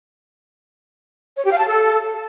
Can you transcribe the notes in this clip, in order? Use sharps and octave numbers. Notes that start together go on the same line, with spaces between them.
C#5
G4
F5
A5
A4